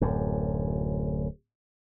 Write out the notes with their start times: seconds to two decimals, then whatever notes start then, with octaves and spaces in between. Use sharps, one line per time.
0.01 D1 F#2